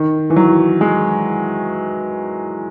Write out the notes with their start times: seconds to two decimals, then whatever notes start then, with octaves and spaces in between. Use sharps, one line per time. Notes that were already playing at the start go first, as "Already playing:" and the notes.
Already playing: D#3
0.30 E3
0.36 F#3
0.81 G#3